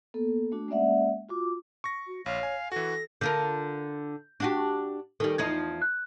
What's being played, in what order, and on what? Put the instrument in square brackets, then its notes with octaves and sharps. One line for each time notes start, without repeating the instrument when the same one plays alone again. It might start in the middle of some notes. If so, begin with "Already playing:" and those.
[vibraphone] A#3 B3 A4
A3 D4 F#4
G#3 A#3 C#4 D5 E5 F#5
F4 F#4 D6
[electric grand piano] C#6 A#6
[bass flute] F#4
[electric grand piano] A#1 [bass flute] C#5 [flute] F5
[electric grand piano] G#5
[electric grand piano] E3 F#4 [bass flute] A4 [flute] A#6
[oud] D3 F4 A#4 [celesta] G6
[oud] D4 F#4 G4
[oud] D#3 G3 [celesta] D#4 A4
[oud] E2 F3 D#4 [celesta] G#6
[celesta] F#6